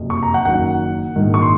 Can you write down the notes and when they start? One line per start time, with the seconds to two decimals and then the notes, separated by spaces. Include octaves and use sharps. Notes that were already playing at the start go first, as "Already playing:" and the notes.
Already playing: F#1 F2 C3
0.10 C#6
0.23 A#5
0.34 F#5
0.45 F#1 F#2 D#3 F#5
1.16 A#1 G#2 D#3
1.34 C#6
1.42 C6